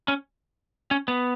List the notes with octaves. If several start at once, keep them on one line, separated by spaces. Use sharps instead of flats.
C#4
C#4
B3